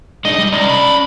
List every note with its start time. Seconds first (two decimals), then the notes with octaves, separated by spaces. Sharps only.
0.25 G#3 D4 D#4 D#5
0.39 G3
0.52 C2 C#4 D5
0.69 B5